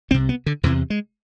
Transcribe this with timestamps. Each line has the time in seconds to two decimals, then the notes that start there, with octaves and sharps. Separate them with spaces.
0.11 C2 C4
0.14 C3
0.29 B3
0.46 D3
0.63 E2 C3 E3
0.90 G#3